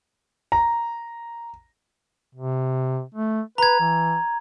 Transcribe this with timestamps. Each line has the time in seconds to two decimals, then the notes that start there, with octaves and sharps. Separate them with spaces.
0.52 A#5
2.35 C3
3.15 A3
3.58 B4 A#5 G#6
3.80 E3